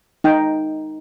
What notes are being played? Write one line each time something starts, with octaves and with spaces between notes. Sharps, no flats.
D#4 G5